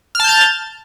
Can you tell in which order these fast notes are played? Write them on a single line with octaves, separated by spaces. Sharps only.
F6 A5 G6 A6